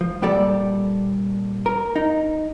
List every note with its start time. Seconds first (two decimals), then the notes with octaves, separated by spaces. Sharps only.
0.01 F3
0.22 A#2 G3 G4 A4 D5
1.66 A#4
1.96 D#4